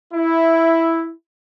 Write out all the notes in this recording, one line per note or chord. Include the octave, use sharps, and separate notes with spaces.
E4